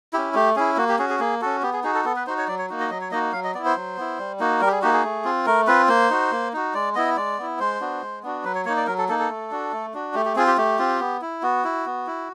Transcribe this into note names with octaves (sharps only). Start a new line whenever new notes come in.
C#4 E4 G4
A3 G4
C#4 E4 G#4
A#3 F#4
G4
C#4 F#4 G#4
G#4
A#3 G#4
C#4 F#4 A4
B3 G4
G#4
D#4 F#4 G#4
A4
B3 A4
B4
D#4 F#4 C5
C#5
F#3 D5
C#5
A#3 D#4 F#4
D#5
F#3 D#5
C#5
A#3 D#4 F#4 D#5
F#3 F5
D#5
B3 E4 D5
C5
F#3
B3 E4
G3
A#3 D#4 F#4
G3 A#4
G4
G#4
A#3 D#4 F#4 G4
G#4
A3
C4 F4
A3 A#4
C4 F4 B4
A#3 C5
D#4 F#4
A#3
D#4 F#4
G#3 D5
B3 E4 D#5
G#3 D5
B3 E4
G#3 C5
B3 D4 F#4
G#3
B3 D4 F#4
F#3 B4
C#5
A#3 D#4 C#5
D5
F#3 A#4
A4
A#3 D#4 A4
A4
A3
D4 F#4
A3
D4 F#4
A3 G4
G4
C4 F4 G#4
G4
A3 G4
C4 F4
B3
E4
B3 F#4
E4
B3
E4